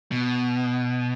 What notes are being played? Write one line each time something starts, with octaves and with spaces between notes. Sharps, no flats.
B2